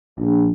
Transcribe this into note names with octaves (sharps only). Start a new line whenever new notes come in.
A#1